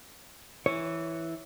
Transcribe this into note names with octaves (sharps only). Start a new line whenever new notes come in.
E3 C#5